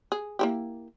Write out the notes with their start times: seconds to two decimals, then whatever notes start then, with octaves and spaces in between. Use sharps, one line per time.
0.12 G#4
0.39 A#3 E4 G4